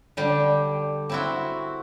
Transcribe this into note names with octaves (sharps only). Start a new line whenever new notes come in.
D3 G3 G5
C4 E4 F#4